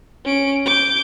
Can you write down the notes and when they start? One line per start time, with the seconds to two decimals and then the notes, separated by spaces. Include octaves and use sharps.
0.25 C#4 D7
0.66 D6 G6